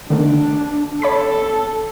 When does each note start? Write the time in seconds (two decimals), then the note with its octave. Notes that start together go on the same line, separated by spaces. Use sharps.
0.10 D3 D#3 A3 D4
1.02 A4 C#5 B5 B6